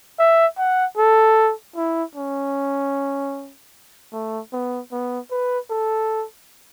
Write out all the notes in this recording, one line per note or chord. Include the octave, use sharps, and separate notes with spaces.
E5
F#5
A4
E4
C#4
A3
B3
B3
B4
A4